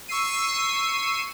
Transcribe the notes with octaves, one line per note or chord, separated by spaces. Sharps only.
C#6 E6 C7 D#7